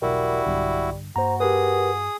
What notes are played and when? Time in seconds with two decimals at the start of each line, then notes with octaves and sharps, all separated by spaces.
0.02 E1 B1 G3 E4 F#4 A#4
0.46 B1 G2 D3
1.16 G2 A#3 F#4 C5 A#5
1.40 G4 G#4 A#4 B4 D#6